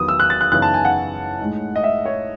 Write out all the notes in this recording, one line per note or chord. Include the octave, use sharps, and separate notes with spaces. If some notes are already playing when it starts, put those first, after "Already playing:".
Already playing: E2 D#3 F#3 B3 D#6
E6
F#6
A6
F#6
F#2 C#3 E3 B3 D#4 F#6
A5
G#5
F#5
A2 G#3 D#4
D#5
E5
C#5